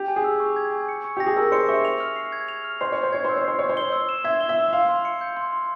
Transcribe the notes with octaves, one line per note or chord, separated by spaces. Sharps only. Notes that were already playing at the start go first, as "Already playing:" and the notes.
Already playing: G4
G#5
G#4
E6
C#6
G#6
G#5
C#7
C#6
G4 A#6
G#4
A#4 E6
C5 C#7
E5 C#6
F7
F6
C7
G#6
F7
F6
C5 C7
C#5 C6
C5
C#5 G#6
C5 E6
C#5
C5 C7
C#5 C6
C5
G7
E6
E7
E5 G#6
G7
E5
E6
F5 C6
C6
C#7
G6
C6
C6